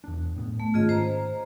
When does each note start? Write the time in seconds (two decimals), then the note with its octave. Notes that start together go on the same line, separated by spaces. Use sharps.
0.04 E2 D4
0.35 D#1 A2 B3
0.60 A3
0.74 G#2 D#3 C#4 F4 G#4 D#5
0.89 C5 A#5